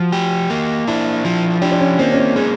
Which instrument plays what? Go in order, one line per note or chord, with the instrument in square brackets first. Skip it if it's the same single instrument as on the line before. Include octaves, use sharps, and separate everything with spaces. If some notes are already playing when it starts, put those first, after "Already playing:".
Already playing: [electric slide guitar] F3 [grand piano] F#4
[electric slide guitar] G4
A#3
[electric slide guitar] D4 [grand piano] E4
[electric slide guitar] F3
[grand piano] D4 [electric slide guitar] G4
[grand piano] D4
C#4
[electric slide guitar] A#3 [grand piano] C4
[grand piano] C#4
C4
[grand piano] G#3 [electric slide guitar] C#4